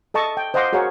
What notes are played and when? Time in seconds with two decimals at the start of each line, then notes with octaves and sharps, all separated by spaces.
0.14 A4 D#5 A5 C#6
0.37 G5
0.54 C5 D#5 F5 F#5 C6 D6
0.73 F#4 G#4 A#4 C#5 F5 F#5